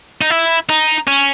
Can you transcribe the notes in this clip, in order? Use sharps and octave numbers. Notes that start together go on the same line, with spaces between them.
D#4
E4
D#4
C#4